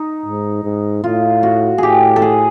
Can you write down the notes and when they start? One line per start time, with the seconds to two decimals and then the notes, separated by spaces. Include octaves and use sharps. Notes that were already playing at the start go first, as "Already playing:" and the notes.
Already playing: D#4
0.26 G#2
0.64 G#2
1.04 A2 F4
1.43 F#4
1.78 A2 G4 G#4
2.16 A4
2.22 G#4